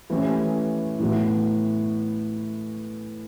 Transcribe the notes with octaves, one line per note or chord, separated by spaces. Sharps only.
E3 A3 C#4 G4 B4
A2 E3 B3 F#4